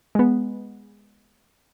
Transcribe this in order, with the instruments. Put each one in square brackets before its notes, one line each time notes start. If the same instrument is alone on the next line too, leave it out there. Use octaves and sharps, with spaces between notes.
[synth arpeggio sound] G#3 B3